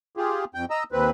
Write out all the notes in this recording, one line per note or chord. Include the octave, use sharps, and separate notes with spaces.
F4 G4 G#4
F2 G5
D#5 A#5 E6
D#2 C4 B4